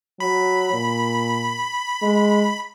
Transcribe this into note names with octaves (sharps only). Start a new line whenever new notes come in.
F#3 B5
A#2
G#3